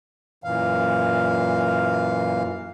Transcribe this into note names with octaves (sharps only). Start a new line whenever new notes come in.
F#2 A#2 E3 F5